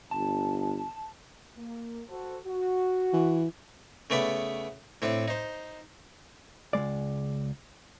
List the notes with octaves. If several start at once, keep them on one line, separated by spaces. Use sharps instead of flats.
G1 A5
A#3
F#4 A4 C5
F#4
E3
C#3 A3 B3 D5 B5
A2 C4 D4
D#4 C5
C#2 B2 G#3 D5